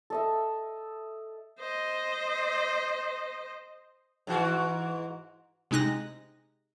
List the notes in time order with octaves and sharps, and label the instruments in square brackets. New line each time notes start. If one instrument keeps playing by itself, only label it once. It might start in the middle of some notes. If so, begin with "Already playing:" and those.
[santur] A4 D#5 E5
[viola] C5 D#5
[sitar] G#2 E3 F#4
[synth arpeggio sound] C3 G#3 D#4 F#6 A#6